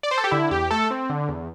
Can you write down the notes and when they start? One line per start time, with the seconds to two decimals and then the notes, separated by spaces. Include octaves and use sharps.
0.03 D5
0.11 C5
0.18 A4
0.24 G4
0.31 D3 E4
0.51 E2 G4
0.71 A3 A4
0.91 C4
1.10 D3
1.29 E2